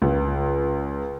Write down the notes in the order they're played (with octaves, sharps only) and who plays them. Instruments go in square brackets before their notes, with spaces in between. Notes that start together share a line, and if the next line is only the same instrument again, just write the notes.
[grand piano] C#2